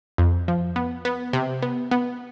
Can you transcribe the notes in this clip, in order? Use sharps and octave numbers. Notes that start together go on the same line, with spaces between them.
F2
F3
B3
B3
C3
B3
B3